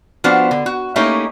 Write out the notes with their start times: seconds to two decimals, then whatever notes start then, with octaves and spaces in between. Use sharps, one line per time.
0.24 F3 B3 D4 F#4 C5
0.51 D3
0.66 F#4
0.96 A3 A#3 C#4 D#4 E4 G4